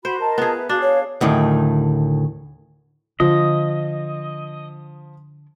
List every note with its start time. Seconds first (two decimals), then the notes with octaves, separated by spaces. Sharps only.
0.05 F#4 C5 B5
0.20 A#4 D#5 A5
0.38 B3 F4 G#4
0.58 B4 E5
0.69 D4 F#4 G#4 F5
0.81 C#5
1.21 D2 A2 D#3
3.20 D3 F3 D#5